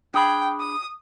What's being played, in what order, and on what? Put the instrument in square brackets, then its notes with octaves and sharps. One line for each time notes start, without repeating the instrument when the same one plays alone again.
[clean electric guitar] D4 G#4 B5 [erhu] G5
[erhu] D#6